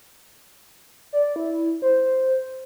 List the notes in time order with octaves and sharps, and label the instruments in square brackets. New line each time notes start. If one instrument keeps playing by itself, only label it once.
[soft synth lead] D5
E4
C5